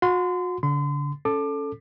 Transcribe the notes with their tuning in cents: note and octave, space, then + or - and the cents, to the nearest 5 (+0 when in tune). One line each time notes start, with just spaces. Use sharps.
F#4 -40 C6 -30
D3 -40 C6 -40
C#4 +0 A4 +0 D6 +25